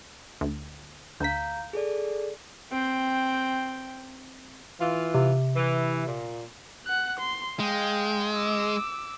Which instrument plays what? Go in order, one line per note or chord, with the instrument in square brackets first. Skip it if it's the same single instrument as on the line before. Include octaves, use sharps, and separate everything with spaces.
[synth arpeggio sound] D2
[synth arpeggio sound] D2 B6 [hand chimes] F5 A#5 G6
[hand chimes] G#4 A4 D5
[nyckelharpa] C4 G5
[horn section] E3 F4
[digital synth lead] C3
[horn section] E3
A#2
[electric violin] F#5 F#6
C6
[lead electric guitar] G#3 [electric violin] F5 G5
[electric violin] D6 E6